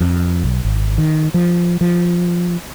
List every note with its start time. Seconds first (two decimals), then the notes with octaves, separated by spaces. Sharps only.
0.01 F2
0.44 B1
0.65 G#1
0.98 D#3
1.34 F3
1.81 F3